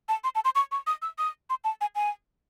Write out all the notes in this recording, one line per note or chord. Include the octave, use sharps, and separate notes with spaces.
A5
C6
A5
C6
C#6
C#6
D#6
E6
D#6
C6
A5
G#5
G#5